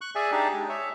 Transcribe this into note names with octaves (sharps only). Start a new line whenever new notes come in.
C#6 F#6
G#4 D5 E5 G#5
D4 D#4 G4 G#4
G#3
C#5 E5